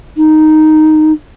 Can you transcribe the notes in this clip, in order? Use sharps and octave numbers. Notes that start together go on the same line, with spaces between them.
D#4